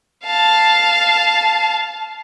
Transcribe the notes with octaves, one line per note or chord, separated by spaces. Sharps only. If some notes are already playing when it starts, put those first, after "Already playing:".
F5 A5